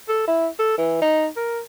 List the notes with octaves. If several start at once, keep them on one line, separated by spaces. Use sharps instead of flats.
A4
E4
A4
E3
D#4
A#4